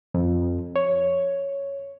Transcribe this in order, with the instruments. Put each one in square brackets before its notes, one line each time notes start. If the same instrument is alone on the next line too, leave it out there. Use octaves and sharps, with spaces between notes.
[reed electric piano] F2
C#5